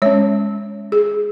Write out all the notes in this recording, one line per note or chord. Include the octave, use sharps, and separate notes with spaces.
G#3 C#4 C#5
G#4